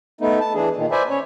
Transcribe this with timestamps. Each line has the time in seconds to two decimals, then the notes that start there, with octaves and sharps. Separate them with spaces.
0.21 A3 B3 D#4
0.40 A5
0.54 E3 D4 G#4
0.76 A#2 D#3
0.91 B4 C5 D5 E5 G#5
1.10 C#4 C#5